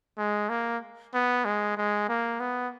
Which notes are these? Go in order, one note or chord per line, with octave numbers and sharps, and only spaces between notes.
G#3
A#3
B3
G#3
G#3
A#3
B3